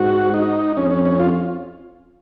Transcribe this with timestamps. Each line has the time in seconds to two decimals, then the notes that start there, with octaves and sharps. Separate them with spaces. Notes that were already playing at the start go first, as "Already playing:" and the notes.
Already playing: G#2 F#4
0.34 D#4
0.77 F2 C#4
0.91 C#4
1.05 C#4
1.20 F4